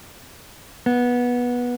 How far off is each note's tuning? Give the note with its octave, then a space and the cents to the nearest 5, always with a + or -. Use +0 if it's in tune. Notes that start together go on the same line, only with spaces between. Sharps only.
B3 -15